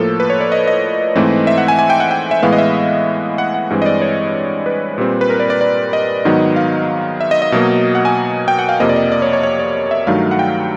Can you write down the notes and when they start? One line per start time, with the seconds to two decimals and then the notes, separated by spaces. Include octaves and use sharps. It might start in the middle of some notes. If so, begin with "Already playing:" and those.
Already playing: A2 F3 A#3 A4
0.20 B4
0.30 C#5
0.41 D5
0.52 D#5
0.67 D#5
1.16 G#2 E3 A3 C4
1.47 E5
1.58 F#5
1.68 G#5
1.79 G#5
1.90 G5
2.00 F#5
2.11 G5
2.31 E5
2.42 A2 E3 G#3 B3 F5
2.53 D#5
2.58 E5
3.38 F#5
3.54 F#5
3.70 G2 E3 G#3 C4
3.82 D#5
3.86 D5
4.02 C#5
4.66 B4
4.98 A#2 G3 C4
5.21 B4
5.30 A#4
5.40 D5
5.50 D5
5.61 D5
5.93 D#5
6.25 G#2 D#3 F#3 B3
6.56 F5
7.21 E5
7.31 D#5
7.42 D#5
7.52 B2 F#3 A#3
7.95 F#5
8.05 G#5
8.48 G5
8.59 F#5
8.69 F5
8.80 F2 C3 F3 A#3 D#5
8.89 D5
8.96 D#5
9.12 D5
9.22 C#5
9.33 C#5
9.43 C#5
9.59 D5
9.91 E5
10.07 G2 D#3 F#3 A3 F5
10.31 F#5
10.39 G5